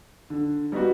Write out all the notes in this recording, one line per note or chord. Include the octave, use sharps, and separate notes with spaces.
D3
G3 B3 D#4 F#4